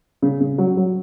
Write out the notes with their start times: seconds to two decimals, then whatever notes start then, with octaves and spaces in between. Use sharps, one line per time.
0.22 C#3
0.40 C#3
0.58 F#3
0.77 F#3